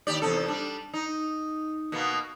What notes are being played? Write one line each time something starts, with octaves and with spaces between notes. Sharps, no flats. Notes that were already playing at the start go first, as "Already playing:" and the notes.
D#2 G4 D5
E2 C3 A4
G3 D4
D#4
B2 A#3 B3